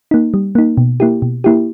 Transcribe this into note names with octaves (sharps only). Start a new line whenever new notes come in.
A#3 D#4
G3
A#3 D#4
B2
A#3 E4 G4
B2
A#3 E4 G4